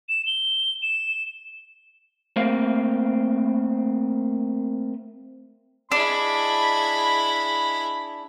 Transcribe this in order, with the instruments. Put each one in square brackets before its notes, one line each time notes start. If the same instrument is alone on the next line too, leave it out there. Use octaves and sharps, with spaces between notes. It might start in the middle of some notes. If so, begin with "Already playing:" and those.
[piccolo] E7
G7
E7
[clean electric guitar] A3 A#3 C4 F5
[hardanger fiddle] G#3 E4 [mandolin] D4 [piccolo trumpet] B5